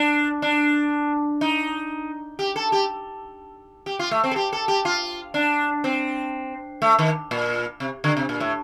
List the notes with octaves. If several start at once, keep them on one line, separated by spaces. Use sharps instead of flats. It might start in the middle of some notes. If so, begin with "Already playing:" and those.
Already playing: D4
D4
D#4
G4
A4
G4
G4
F4
A3
C4
A4
G4
A4
G4
F4
D4
C4
A3
D#3
A#2
C3
D3
C3
A#2
A2